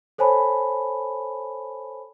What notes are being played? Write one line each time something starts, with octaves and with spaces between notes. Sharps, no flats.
A4 C5 C#5 G#5 A5 B5